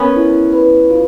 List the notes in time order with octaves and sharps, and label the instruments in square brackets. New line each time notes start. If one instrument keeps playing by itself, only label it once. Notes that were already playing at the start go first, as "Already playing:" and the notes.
Already playing: [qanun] B3 C#4 [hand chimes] A#4
[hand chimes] E4
B4
F4